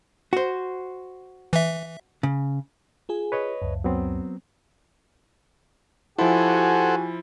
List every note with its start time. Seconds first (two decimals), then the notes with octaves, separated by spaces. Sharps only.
0.33 F#4 C5
1.53 E3 E5
2.23 C#3
3.09 F4 G#4 G#5
3.32 B4 C#5 D#5
3.62 C#2 F#2
3.84 F#3 B3 C4
6.19 F3 E4 F#4 G4 A4 C5 F#5 G#5